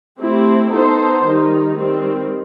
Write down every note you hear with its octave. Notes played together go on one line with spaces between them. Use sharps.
A3 C4 E4 G4
B3 D#4 A4 C5
D#3 G3 D#4
D#3 G3 C4